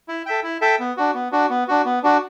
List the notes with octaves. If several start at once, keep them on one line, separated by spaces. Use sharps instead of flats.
E4
A4 E5 G5
E4
A4 E5 G5
B3
D4 F#4
B3
D4 F#4
B3
D4 F#4
B3
D4 F#4